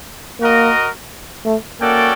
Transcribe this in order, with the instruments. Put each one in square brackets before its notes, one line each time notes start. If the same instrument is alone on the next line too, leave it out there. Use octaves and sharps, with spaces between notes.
[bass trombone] A#3 [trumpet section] F#4 A#4 D#5
[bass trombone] A3
[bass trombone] A#3 [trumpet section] C#4 F#4 A4 D5 G5